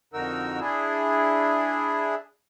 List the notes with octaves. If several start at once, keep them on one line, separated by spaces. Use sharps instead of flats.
F2 D3 D#4 F#4 A#4 E6
D4 E4 G#4